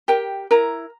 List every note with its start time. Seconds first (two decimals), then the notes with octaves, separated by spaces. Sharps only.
0.08 G4 A#4 G5
0.51 E4 A#4 A#5